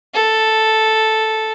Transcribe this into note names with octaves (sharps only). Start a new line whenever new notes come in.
A4